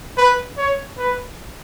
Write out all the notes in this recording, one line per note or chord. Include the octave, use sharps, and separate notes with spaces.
B4
C#5
B4